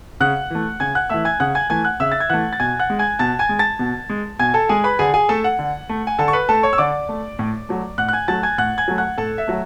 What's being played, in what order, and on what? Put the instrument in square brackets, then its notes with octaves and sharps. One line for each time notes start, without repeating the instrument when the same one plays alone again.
[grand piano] C#3 F#5 F#6
E3 A3
C#3 G#5 G#6
F#5 F#6
E3 A3 E5 E6
G#5 G#6
C#3 F#5 F#6
G#5 G#6
E3 A3 G#5 G#6
F#5 F#6
C#3 E5 E6
A6
G#6
E3 A3 F#5 F#6
A6
B2 G#5 G#6
F#5 F#6
G#3
G#5 G#6
B2 A5 A6
G#5 G#6
G#3
A5 A6
B2
G#3
B2 G#5 G#6
A4 A5
G#3 G#4 G#5
B4 B5
D3 G#4 G#5
G#4 G#5
A3 A4 A5
F#5
D3
A3
G#5
D3 A4 A5
C#6
B4 B5
A3 A4 A5
C#5 C#6
E6
D3 D5 D6
A3
A2
F#3 A3
A2 F#5 F#6
F#6
G#5 G#6
F#3 A3 A5 A6
G#5 G#6
A2 F#5 F#6
G#5 G#6
F#3 A3
F#5 F#6
A2 A4 A5
E5
F#3 A3